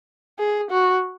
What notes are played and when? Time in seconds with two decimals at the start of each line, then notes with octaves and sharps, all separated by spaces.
0.39 G#4
0.71 F#4